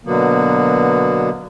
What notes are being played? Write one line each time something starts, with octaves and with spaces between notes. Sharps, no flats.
B2 D3 F#3 A#3 B3